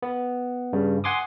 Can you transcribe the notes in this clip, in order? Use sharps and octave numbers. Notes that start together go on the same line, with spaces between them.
B3
G2 C#3
F#5 G#5 C6 D6 D#6